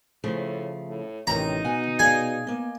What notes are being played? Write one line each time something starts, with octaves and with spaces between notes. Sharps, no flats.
A2 C#3 F3 A3
A2
A1 C3 D#3 C#4 D#4 A#5
B2 F#5 G#5
G#4 D5 F5 G#5
A#3 B3 D#5